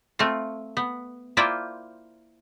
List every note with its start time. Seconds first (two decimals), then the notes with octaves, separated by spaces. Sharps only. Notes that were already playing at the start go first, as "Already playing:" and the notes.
0.19 A3 C4 F4
0.77 B3
1.37 A#3 E4 F4 C5 D5 G5